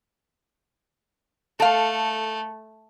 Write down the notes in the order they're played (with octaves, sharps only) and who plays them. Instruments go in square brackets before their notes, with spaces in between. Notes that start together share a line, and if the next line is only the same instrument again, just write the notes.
[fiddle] A3 [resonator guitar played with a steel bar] A4 F5